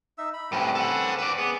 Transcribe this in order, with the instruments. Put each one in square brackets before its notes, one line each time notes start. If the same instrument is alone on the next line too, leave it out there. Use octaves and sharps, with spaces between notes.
[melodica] D#4 E5 E6
B5
[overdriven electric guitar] A2 G3 [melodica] C4 C#4 B4
[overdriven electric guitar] A4 F#5
B4 D5
[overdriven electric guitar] B3 [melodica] G#4